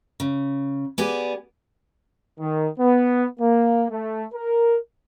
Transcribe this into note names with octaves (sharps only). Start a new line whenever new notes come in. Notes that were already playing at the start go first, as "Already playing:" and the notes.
C#3
B3 G4 G#4 D5
D#3
B3
A#3
A3
A#4